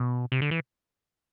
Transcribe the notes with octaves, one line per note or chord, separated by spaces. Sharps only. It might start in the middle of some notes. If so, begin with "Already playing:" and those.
Already playing: B2
C3
D3
E3